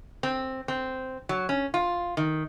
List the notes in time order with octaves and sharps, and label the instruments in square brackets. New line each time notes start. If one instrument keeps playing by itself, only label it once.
[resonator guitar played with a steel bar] C4
C4
F#3
C#4
F4
D#3